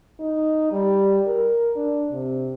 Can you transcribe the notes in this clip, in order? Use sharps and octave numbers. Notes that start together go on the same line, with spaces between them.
D#4
G3
A#4
D4
C3